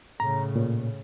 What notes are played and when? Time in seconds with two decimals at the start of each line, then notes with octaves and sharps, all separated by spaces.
0.20 A2 C#3 A#5
0.56 A#2